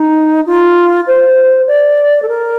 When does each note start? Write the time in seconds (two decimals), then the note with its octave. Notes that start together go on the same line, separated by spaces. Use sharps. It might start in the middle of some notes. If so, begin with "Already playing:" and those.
Already playing: D#4
0.46 F4
1.07 C5
1.67 D5
2.22 A4
2.28 A#4